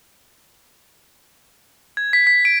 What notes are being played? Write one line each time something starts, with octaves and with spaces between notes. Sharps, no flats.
G#6
B6
B6
D7